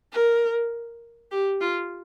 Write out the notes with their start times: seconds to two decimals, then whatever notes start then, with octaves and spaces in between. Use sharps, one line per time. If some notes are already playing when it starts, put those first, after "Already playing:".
0.13 A#4
1.31 G4
1.61 F4